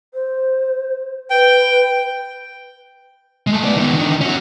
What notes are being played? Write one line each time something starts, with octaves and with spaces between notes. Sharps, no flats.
C5
B4 G5
G#3 A3
B3 D5
D#3 B3
D3 D#3
C#4 F#4